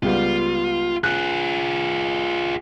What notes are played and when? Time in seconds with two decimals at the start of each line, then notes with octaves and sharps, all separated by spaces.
0.03 C#2 G3 B3 F4
1.04 F4 G#4 F#6